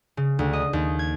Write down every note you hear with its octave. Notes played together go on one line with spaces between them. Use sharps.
C#3
D2
D#5
D#2
G#6